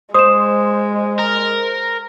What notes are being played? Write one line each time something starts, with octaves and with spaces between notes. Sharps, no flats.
G#3 C5 D#6 E7
A#4